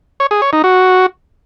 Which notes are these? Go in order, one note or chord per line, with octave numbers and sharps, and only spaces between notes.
C#5
G#4
C#5
D#4
F#4